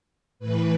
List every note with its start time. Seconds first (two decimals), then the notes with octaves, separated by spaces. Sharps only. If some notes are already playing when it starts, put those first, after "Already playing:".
0.39 A2 E3 B4